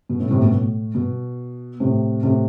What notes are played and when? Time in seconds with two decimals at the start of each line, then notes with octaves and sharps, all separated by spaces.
0.09 B2
0.20 A2
0.31 A2 C3
0.42 B2
0.52 A2
0.95 B2
1.80 A2 C3
2.23 A2 C3